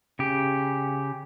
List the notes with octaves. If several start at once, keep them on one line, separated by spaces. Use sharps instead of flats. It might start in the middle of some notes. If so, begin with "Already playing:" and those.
C#3 G4